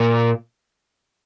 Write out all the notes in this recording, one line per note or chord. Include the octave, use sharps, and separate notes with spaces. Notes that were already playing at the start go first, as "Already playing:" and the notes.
Already playing: A#2